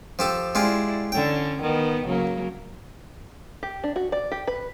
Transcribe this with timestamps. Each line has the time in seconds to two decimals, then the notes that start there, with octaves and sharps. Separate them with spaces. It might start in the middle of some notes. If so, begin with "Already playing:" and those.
0.19 F3 G4 A4
0.55 G#3 E4 F4 G4 D5
1.12 D3 C#4 G5
1.62 D#3 B3
2.05 C#3 F#3 A#3
3.63 G4
3.84 D4
3.96 F#4
4.12 D5
4.32 G4
4.47 B4